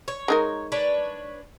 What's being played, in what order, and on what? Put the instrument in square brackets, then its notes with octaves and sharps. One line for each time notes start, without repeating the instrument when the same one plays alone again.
[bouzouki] C#5
[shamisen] G#3 D#4 A#4
[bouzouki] D4 B4 C#5